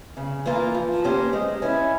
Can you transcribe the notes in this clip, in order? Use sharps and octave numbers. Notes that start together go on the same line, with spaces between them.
C#3
E3 A#3 F4 A#4
F3
A#3 C#4 G4 C5
G#3
C#4 E4